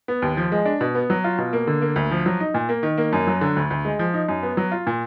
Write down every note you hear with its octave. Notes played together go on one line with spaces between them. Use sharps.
B3
D#2
F3
G#3
D4
B2
B3
F#3
F4
B2
A#3
D3
A#3
D2
F3
F#3
D#4
A#2
A#3
D#3
A#3
F#2
F#3
D3
D2
D2
G#3
F3
D#4
F#2
B3
F#3
F4
A#2